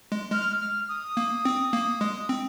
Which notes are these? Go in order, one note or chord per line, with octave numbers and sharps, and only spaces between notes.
G#3
G#3 F6
F6
D#6
A#3
C4
A#3
G#3
C4